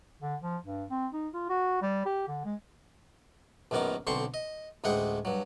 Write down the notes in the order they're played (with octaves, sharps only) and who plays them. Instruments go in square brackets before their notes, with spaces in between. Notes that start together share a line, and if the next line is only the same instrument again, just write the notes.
[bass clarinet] D3
F3
G2
C4
D#4
F4
F#4
G3
G4
D3
G#3
[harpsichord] A#1 F#2 D#3 B3 A#4 D6
B1 D3 C4 C5 C6 C#6
D#5
A1 D2 G#3 G#4 F#5 G5
G2 F#3